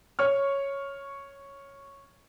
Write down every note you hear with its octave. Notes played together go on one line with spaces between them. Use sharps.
C#5 C#6 F6